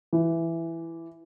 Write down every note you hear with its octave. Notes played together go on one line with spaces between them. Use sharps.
E3